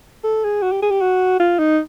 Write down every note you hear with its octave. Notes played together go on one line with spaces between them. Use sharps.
A4
G#4
F#4
G4
G#4
G4
F#4
F4
D#4